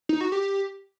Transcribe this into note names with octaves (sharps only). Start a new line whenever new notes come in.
D#4
F#4
G4